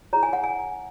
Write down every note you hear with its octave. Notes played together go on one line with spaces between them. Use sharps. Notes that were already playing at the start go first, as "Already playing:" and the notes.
E4 G#4 C#5 A#5
G#5
F#5
G#5